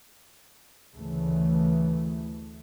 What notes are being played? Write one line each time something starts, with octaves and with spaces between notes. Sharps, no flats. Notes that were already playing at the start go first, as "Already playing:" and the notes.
D2 C#3 E3 A3